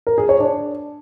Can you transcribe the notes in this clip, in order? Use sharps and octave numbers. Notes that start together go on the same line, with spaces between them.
A#4
G#4
C#5
D4